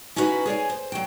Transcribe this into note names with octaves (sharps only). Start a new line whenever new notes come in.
C#4 D#4 E4 F#4 B4
G#4 C#5 D5 G#5
C5
F#3 G5